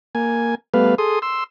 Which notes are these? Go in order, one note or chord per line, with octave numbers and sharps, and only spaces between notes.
A#3 G#5
G3 A3 B3 B4 F5
G#4 A4 C6 D#6
C6 E6